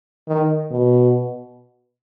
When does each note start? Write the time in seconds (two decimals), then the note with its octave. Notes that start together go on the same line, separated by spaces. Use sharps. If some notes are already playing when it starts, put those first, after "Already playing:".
0.28 D#3
0.71 B2